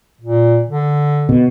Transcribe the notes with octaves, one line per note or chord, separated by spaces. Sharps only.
A#2
D3
B2